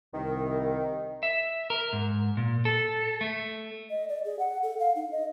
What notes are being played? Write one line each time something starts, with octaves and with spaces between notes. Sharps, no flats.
C2 D#3
E5
A#4
G#2
A#2
A4
A3
D#5
D5
G#4
F#5
A4
F5
D#4
D#5